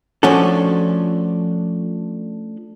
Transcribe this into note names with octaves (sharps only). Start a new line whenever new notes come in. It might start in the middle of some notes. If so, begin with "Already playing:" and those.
F3 A3 C#4 D4 F#4 A4